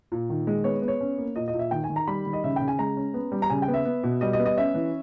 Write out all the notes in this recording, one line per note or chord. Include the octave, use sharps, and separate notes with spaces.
A#2
D#3
G#3
B3 C#5
B3
C#5
C#4
A#3
A#2 D#5
D#5
A#2
E5
D#3 G5
G#5
D#3
A#5
G3 B5
D#3
D#5
C#3 E5
C#3 G5
G#5
G#3 A#5
C#4
B3
G3
A#5
C#3 G#5
G5
B3
E5
B3
B2
G3 D#5
D#5
B3
D#5
C#4 E5
E3